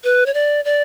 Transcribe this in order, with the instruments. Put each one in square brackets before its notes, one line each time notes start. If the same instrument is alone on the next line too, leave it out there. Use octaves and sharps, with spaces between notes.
[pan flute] B4
C#5
D5
D5